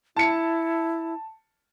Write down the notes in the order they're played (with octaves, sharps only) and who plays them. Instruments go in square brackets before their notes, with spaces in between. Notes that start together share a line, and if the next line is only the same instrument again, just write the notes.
[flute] E4 [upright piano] A5 C#7